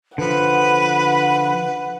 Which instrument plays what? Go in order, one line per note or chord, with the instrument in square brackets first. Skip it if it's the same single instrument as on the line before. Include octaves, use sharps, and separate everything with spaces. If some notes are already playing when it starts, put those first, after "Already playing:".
[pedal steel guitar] D3 F3 [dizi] B4 [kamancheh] F#5